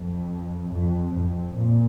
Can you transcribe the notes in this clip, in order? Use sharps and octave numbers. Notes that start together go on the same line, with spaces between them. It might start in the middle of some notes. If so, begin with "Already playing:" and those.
Already playing: F2
F2
F2
A#2